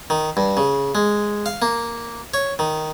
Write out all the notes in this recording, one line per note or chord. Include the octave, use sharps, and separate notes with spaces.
D#3
G2
C#3
G#3
F5
A#3
C#5
D#3